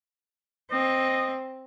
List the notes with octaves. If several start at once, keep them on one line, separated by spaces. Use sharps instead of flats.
C4 D#5